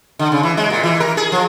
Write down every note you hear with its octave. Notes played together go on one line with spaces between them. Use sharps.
D3
C#3
E3
G#3
A#2
E3
A#4
G#4
F3